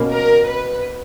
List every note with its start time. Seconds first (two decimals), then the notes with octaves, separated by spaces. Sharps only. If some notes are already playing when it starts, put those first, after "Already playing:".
Already playing: B2 A#3 C#4
0.12 A#4
0.48 B4